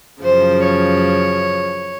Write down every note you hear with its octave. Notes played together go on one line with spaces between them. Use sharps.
F#2 C#3 F3 C5
C#5